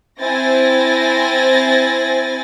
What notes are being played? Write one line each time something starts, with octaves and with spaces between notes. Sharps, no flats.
C4 E4 G#5 A6 A#6